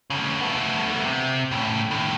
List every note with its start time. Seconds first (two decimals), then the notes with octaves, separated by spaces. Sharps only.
0.10 D2 C#3
0.41 A3 B3
1.05 C3
1.51 A2 C#3
1.91 A2 D#3